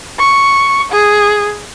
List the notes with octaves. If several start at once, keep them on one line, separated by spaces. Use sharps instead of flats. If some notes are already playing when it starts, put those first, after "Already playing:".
C#6
G#4